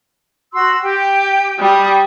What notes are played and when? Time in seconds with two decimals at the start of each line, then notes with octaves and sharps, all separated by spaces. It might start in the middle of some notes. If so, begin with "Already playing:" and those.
0.52 F#4 C6 E6
0.82 G4 G5
1.59 G3 D#6